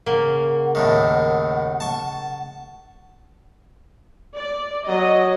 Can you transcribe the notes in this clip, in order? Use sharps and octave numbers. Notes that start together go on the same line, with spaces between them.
C#3 A#3 F#5
D#2 A2 D#3
A5 C#6
D5
F#3 D#5